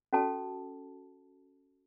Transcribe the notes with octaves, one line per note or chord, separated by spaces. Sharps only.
C#4 F#4 A4 A5